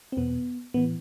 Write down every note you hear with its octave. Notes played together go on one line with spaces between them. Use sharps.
C4
E2 B2 B3
A2 E3 B3